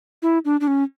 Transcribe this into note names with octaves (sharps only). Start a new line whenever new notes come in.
E4
D4
D4
C#4